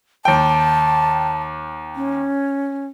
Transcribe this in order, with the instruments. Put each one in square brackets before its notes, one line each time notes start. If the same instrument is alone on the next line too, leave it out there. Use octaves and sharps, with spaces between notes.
[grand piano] D#2 G5 [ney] A5
[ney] C#4